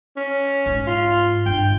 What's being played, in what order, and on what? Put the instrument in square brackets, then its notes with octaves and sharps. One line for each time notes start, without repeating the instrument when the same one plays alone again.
[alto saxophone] C#4
[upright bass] G#2
[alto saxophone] F4
[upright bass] G1 [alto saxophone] G5